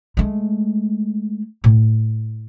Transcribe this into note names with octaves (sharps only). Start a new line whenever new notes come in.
G#3 A3
A2